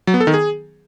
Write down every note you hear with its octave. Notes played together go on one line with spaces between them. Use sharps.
F#3
B3
A4
D#3
G#4